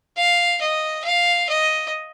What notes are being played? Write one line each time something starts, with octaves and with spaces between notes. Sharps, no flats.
F5
D#5
F5
D#5